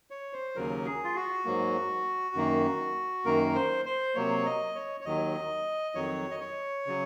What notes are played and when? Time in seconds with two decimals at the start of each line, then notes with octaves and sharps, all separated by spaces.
0.10 C#5
0.33 C5
0.56 D#2 C#3 F#3 A#4
0.86 G#4
1.04 F4
1.16 F#4
1.45 G#2 F#3 A#3
2.35 F#2 D#3 A#3
3.25 F#2 D#3 A#3 A#4
3.55 C5
3.85 C5
4.15 C3 F#3 A#3 C#5
4.46 D#5
4.75 C#5
5.01 C#5
5.05 D#2 D#3 F#3 D#5
5.95 F2 D#3 F#3 C#5
6.31 D#5
6.40 C#5
6.86 C#3 F#3